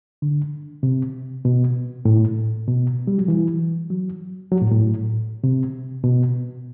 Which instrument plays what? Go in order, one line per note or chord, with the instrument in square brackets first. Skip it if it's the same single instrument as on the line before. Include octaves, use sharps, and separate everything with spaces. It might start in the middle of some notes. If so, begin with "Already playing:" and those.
[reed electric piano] D3
C3
B2
A2
B2
G3
F#3
E3
F#3
F#3
A2
A2
C3
B2